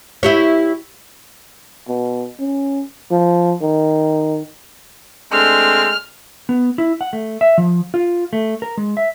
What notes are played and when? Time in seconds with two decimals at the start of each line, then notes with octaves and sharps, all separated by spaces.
0.23 E4 G4 C#5
1.88 B2
2.39 C#4
3.11 F3
3.61 D#3
5.32 G#3 A3 C4 D4 F6
6.49 B3
6.78 E4
7.01 F#5
7.13 A3
7.41 E5
7.58 F3
7.94 F4
8.33 A3
8.62 A#4
8.77 G#3
8.97 E5